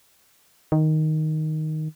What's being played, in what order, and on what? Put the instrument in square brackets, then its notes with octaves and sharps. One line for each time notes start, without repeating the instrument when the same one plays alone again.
[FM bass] D#3